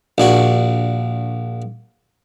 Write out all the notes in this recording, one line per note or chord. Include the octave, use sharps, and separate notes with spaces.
A#1 D4 F#4